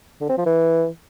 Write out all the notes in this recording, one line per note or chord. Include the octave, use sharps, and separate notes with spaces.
D3
C4
F3
E3